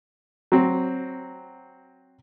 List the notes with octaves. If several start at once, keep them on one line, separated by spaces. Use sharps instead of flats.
F#3 C4